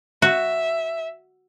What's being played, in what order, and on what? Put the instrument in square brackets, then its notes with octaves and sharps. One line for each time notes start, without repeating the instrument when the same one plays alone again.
[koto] F#4 [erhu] E5